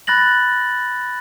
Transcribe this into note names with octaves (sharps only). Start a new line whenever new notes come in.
B5 F#6 A6 A#6 F#7